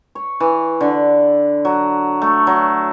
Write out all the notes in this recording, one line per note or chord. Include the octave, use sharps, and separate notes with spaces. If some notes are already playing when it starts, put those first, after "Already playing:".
C#5
E3
D3
F#3
A3
F#3